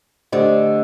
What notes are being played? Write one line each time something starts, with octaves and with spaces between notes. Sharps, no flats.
D3 A3 D4 G4 C5 D#5